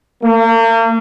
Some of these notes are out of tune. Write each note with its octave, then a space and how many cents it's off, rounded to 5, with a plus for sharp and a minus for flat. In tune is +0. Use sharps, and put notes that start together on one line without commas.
A#3 -40